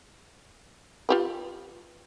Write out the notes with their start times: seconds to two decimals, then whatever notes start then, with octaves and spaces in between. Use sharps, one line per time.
1.09 F4 G4 B4